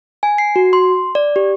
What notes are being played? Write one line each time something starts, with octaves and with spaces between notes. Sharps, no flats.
G#5
C7
F#4
C6
D5
G4